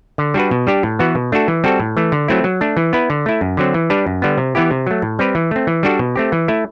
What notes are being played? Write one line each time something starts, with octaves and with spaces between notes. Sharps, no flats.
D3
G3 D4 F#4 B4
B2
G3 D4 G4
A2
E3 B3 F#4
B2
A3 D4 F#4 A4
E3
G3 C4 F#4 A4
A2
E3 A3
D3
F#3 A3 C4 E4
F#3
A3 D4
E3
B3 E4 B4
D3
A3 E4
F#2
D3 F#3 C4
E3
G3 D4 G4 B4
F#2
D3 G3 B3
C3
E3 B3 E4 G4
C3
F#3 A3
A2
G3 C4 G4 B4
E3
A3 C4
E3
G3 D4 F#4 A4
B2
A3 C4 G4
E3
A3 E4